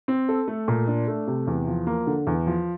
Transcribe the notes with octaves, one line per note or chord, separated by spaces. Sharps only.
C4
A4
A3
A#2
D4
A3
C3
E2
F3
A#3
D3
E2
F3